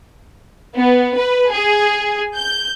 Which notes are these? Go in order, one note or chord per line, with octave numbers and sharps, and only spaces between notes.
B3
B4
G#4
G6